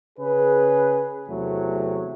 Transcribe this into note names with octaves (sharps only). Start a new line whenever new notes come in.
C#3 G#4 B4
E2 C3 F#3 A3